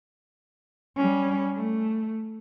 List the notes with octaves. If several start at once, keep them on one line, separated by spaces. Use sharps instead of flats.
G3 C#4
A3